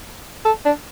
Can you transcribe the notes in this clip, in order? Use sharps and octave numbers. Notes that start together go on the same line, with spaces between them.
A4
D4